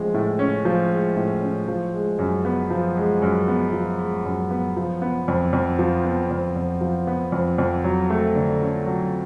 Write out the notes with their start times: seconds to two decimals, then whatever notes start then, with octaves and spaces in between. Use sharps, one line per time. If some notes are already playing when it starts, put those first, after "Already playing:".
Already playing: A2 F3 G#3 C#4
0.14 A2
0.39 C#4
0.65 F3
0.91 G#3
1.16 A2
1.42 C#4
1.68 F3
1.94 G#3
2.19 F#2
2.45 B3
2.70 F3
2.97 G#3
3.22 F#2
3.48 B3
3.73 F3
3.99 G#3
4.25 F#2
4.51 B3
4.77 F3
5.02 B3
5.28 F2
5.53 F2
5.79 F3
6.05 B3
6.31 F2
6.56 F2
6.81 F3
7.07 B3
7.32 F2
7.58 F2
7.84 F#3
8.10 A3
8.35 D3
8.62 C#4
8.86 F#3